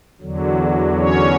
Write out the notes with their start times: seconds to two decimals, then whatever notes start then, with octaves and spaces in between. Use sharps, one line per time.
0.21 E2 D3 F#3
0.98 C#4 C#5